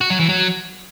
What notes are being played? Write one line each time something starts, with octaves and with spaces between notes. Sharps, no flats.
F#4
F#3
E3
F#3